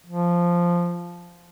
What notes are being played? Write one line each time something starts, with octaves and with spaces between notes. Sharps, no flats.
F3